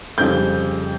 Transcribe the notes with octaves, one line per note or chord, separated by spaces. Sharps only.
F2 C#3 G3 G6